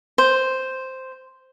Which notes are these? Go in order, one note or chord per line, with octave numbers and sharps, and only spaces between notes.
C5